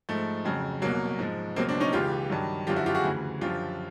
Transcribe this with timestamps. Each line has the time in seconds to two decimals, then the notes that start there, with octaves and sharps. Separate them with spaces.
0.09 G#2 F3 A3
0.45 F2 C#3 F#3
0.82 C2 B2 F#3 A#3
1.19 G#2 F3
1.56 C#2 B2 F#3 A#3 C4
1.68 C4 D4
1.80 C#4 D#4
1.93 C#2 C#3 E3 F4 G4
2.30 G2 D#3 F#3
2.67 F#2 D3 F3 F4 G4
2.76 E4 F#4
2.86 F4 G4
2.95 F#4 G#4
3.04 D2 C#3 E3
3.41 F#2 D3 F3 F4 G4